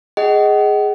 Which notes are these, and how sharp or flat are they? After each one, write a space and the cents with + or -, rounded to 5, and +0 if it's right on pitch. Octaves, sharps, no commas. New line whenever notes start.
G#4 +0 D#5 +0 F#5 +40